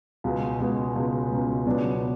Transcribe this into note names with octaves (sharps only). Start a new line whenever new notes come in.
C#2 B2 G#3
C#2 B2 G#3
C#2 B2 G#3
C#2 B2 G#3
C#2 B2 F#3 B3 D4